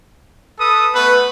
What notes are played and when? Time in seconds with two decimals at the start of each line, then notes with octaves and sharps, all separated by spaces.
0.59 A4 B4 D#6
0.94 A3 B3 B4